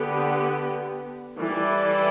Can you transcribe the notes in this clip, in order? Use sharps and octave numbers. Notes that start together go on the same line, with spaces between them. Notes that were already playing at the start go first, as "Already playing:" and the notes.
Already playing: D3 B3 G4
E3 G3 E4 A4 D5